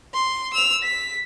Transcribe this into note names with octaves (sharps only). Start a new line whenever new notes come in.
C6
E6 F7
B6